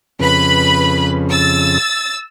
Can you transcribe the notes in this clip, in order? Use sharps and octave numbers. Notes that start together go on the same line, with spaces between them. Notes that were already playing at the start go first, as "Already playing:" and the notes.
F2 C#3 B4 B5
E6 A6